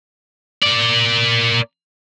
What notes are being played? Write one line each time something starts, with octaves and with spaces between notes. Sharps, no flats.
A#3 D5